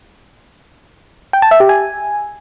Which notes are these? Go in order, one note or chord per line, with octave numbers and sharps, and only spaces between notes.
G5
A5
E5
G4
G#5